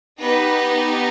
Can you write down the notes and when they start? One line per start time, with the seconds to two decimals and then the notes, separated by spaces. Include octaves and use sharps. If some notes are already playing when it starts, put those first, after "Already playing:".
0.21 B3 D#4 G4 B4